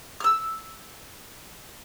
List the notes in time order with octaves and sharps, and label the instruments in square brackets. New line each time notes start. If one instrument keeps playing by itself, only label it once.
[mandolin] E6 F6